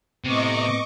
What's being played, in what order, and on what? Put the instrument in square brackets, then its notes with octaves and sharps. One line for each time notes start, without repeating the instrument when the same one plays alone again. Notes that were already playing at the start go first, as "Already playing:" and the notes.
[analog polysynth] A2 B3 C4 [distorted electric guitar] C3 [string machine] D#5 C#6 D6